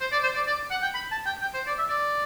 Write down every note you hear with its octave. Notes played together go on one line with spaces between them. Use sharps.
C5
D5
C5
D5
D5
F#5
G5
B5
A5
G5
G5
C5
D5
E5
D5